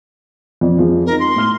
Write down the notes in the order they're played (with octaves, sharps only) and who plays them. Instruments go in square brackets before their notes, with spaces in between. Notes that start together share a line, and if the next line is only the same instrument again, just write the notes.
[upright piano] F2 D5
F2 F3 G#3
[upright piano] C4 D#4 [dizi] A#4
[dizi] C6
[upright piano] A2 F6 G7